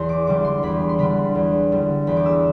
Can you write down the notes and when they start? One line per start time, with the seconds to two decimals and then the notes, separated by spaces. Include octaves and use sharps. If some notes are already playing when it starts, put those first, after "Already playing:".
Already playing: E2 C6
0.09 D6
0.27 D3 G3 D6
0.45 C6
0.63 E2 B5
0.89 C6
0.99 D3 G3 B5
1.35 E2
1.72 D3 G3
2.07 E2 B5
2.16 D6
2.26 E6